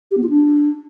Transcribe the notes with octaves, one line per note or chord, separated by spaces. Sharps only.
G4
B3
F4
D4